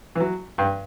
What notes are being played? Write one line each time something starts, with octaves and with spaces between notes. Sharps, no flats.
E3
F#3
G2